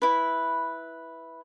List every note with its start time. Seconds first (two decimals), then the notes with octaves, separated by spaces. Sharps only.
0.02 E4 B4